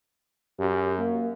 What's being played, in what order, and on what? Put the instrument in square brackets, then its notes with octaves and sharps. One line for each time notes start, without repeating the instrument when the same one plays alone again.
[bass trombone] F#2 [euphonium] G4
[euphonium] A#3